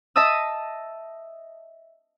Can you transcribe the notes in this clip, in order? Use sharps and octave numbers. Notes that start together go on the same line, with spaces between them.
D#5 E5 A5 D#6 E6